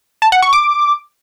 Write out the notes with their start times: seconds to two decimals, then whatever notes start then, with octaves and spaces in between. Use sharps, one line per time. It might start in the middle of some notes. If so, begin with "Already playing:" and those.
0.22 A5
0.32 F#5
0.42 C#6
0.53 D6